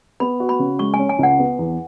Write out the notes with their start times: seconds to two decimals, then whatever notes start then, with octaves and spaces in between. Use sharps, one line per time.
0.20 B3 B5
0.40 F#4
0.49 B5
0.59 C#3
0.79 G#3 C#6
0.94 G#5
0.99 C#4
1.09 G#5
1.19 C#2 F#5
1.39 B3
1.59 E2